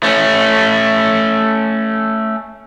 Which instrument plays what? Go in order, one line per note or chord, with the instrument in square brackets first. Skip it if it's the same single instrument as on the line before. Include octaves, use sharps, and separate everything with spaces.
[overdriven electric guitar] A3 C#4